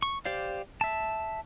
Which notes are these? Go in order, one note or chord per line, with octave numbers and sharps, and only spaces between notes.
C#6
G4 C5 D5 F5
E5 A5